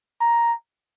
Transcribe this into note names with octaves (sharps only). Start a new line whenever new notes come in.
A#5